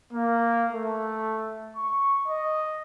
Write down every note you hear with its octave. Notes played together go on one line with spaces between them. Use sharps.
A#3
A3
C#6
D#5